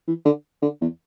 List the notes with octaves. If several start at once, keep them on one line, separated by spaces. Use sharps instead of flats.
E3
D3
D3
E2